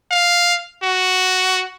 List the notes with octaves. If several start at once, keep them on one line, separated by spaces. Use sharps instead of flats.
F5
F#4